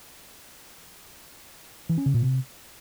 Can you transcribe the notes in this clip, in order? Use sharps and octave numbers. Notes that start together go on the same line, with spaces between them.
E3
C#4
C#3
A#2
C3